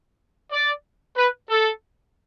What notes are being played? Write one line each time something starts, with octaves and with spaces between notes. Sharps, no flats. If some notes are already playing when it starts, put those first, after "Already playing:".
D5
B4
A4